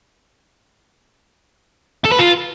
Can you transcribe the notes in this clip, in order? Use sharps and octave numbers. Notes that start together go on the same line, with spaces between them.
A4
B4
F4